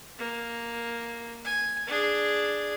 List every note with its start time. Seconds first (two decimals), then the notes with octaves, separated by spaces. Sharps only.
0.18 A#3
1.45 G#5
1.87 D4 G#4